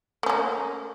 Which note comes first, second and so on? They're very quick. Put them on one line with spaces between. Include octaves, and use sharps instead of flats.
A3 C#4 A#3